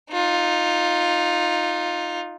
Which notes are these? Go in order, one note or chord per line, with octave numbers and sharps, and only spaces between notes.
D#4 F4